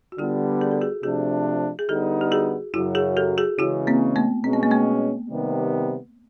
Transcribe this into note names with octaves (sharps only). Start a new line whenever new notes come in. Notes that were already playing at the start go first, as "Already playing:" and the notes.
F#4
D3 G3 B3 F4 G4
G#4
A4
F#4 G#4
C3 F3 A3 D4 F#4 G#4
G#4
D3 G3 B3 D#4 G4 A4
G4
F#4 G#4
F#2 C#3 F#3 E4 F#4
F#4 G#4
G4 A4
F#4 G#4
C#3 E3 G#3 C#4 E4 F#4
A#3 C4
A3 B3
B2 G#3 C4 C#4
B3
A#3
A3 B3
C3 D#3 G3 B3